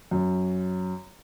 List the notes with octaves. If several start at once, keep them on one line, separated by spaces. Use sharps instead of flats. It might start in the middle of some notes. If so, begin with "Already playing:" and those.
F#2